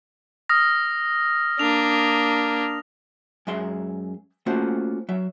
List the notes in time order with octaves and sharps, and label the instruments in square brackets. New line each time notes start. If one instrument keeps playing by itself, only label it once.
[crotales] D#6 F6 A#6
[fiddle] A#3 D4 [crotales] F7
[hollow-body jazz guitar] F#2 G#3 E5 C6
A3 A#3 C#4 F4 F#4 C5
F#3 E5